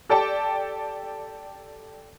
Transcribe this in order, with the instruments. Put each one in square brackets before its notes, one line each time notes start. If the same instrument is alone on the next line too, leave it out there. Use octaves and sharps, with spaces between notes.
[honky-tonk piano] G4 A4 D5 G5 A5